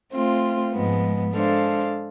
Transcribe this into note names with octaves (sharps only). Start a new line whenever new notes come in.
A3 C4 F4
G#2 F3 G#3 B3
G#3 D4 A4 C5 F5